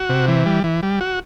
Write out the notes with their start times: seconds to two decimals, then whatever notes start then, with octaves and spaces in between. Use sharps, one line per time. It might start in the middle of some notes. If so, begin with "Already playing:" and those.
Already playing: F#4
0.09 C3
0.28 E3
0.46 G3
0.64 E3
0.83 G3
1.01 F#4